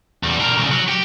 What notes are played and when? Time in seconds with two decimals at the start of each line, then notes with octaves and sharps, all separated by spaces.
0.23 E2 G3
0.40 D4 A#4
0.58 C2 C#3
0.71 F#3
0.89 G4